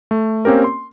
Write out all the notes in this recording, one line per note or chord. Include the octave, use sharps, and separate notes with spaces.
A3
A#3 C4 C#4 G4 A#4
C6